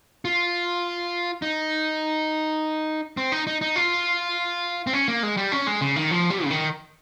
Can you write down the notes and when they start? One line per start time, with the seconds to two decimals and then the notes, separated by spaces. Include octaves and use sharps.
0.25 F4
1.42 D#4
3.17 C4
3.32 D#4
3.47 D#4
3.61 D#4
3.76 F4
4.87 C4
4.93 C#4
5.08 A#3
5.23 G#3
5.37 G3
5.52 C#4
5.67 G#3
5.81 C#3
5.96 D#3
6.11 F3
6.30 G3
6.44 C#3
6.50 D#3